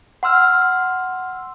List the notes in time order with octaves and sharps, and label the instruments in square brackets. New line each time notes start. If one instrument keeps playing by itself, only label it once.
[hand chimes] F#5 C6 E6 F6